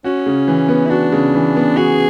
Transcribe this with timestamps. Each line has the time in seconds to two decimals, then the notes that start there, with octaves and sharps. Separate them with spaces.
0.04 C#4 F#4
0.26 C#3
0.48 E3
0.68 B3
0.86 E4
0.90 D4 F#4
1.12 C#3
1.35 E3
1.56 B3
1.77 F#4 G#4